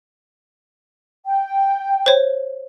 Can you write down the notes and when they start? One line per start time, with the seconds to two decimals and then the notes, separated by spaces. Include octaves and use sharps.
1.26 G5
2.06 C5 C#5